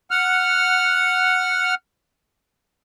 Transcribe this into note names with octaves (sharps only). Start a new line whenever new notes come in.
F#5 F6